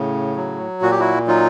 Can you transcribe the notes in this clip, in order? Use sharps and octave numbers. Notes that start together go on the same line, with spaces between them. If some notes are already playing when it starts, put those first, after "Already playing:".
Already playing: A2 C#3
F#3
A#2 F#4
G4
E4 F#4
F#3 D#4 F4